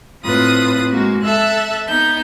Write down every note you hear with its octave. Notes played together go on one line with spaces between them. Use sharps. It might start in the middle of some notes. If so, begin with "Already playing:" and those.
A2 C4 F4 B4 D#6
G#3 A#3 F#4
A4 E5 E6 F#6
B3 D#4 G6